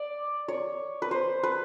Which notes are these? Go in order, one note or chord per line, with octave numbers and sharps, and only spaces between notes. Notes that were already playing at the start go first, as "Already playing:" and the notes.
Already playing: D5
C#5
B4
C5
B4